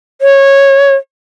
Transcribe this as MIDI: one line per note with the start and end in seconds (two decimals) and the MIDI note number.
0.22 0.95 73